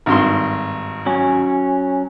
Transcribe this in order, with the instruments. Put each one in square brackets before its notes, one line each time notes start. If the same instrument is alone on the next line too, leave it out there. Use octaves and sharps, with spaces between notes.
[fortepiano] G#1 G2 C6
[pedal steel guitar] F#3 C#4